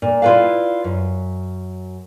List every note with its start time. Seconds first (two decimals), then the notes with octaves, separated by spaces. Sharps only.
0.02 A#2
0.22 E4 F4 G4 B4 D5 F5
0.84 F#2